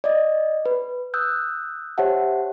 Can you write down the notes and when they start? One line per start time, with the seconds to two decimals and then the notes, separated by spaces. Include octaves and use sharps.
0.04 D5 D#5
0.66 B4
1.14 D#6 E6 F#6 G6
1.98 G4 C5 C#5 E5 F#5 A5